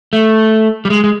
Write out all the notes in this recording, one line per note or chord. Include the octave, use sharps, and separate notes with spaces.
A3
G3
G#3
G#3